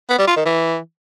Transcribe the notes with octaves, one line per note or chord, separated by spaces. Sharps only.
B3
G3
F4
D#3
E3